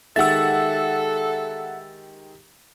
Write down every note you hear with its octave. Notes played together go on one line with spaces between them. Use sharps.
D#3 G#3 G4 A4 E5 F#5 E6 A6